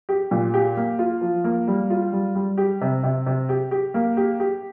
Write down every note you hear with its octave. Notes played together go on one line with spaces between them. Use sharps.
G4
A#2
G4
A#3
F4
F3
A#3
G3
F4
G3
G3
G4
C3
C3
C3
G4
G4
A#3
G4
G4